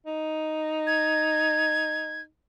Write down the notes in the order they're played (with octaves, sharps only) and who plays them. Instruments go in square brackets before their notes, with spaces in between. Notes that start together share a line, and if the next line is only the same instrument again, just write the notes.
[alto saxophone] D#4
[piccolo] G#6